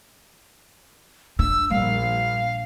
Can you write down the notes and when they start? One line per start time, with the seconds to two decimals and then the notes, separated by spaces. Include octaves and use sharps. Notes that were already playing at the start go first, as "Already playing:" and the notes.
1.39 D4 F4 E6
1.70 A#1 G3 F5